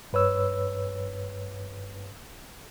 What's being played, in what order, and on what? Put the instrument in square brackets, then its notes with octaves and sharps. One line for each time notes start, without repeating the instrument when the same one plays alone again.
[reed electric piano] G2 B4 C#5 E6